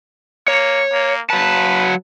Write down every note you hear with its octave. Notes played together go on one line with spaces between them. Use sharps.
A#3 C#5
A#3
F#3 B4 A5